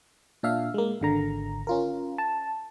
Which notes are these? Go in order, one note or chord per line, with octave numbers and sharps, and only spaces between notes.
A#2 D4 E5 F5
G#3 A#3
G#1 D3 A#5
C#4 F4 A#4
A5